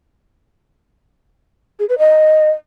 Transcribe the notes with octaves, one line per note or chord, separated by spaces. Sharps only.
G#4
B4
D#5